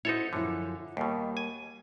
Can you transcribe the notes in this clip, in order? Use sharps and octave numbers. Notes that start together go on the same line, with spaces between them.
D#4 E4 F#4 A4 C5 C#5
F#2 D3 F3 E4
D#2 B2 G3 A#3
G#5